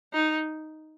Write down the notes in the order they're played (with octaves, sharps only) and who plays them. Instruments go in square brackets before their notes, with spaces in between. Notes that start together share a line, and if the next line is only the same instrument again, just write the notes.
[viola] D#4